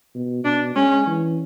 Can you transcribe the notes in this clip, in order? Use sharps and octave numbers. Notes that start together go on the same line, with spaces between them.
B2
B2 D4
G#3 C#4
E3